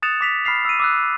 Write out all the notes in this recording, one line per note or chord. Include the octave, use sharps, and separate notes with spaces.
D#6 F#6 A6 C#7 E7 F7
D6 B6 F7
B5 F6 C7 F7
E6 D#7
D6 E6 F#6